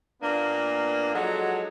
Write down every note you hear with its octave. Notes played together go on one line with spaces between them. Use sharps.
A#2 A#3 B3 D4
F3 F#3 G#3 D#4 F#4 A4